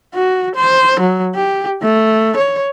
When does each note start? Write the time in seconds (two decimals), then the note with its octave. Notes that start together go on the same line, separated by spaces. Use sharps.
0.14 F#4
0.55 C5
1.00 F#3
1.35 G4
1.82 A3
2.36 C#5